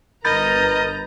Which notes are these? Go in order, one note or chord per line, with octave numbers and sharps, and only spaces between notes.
G1 A#4 B4 D#5 A#5 B5 G6 A6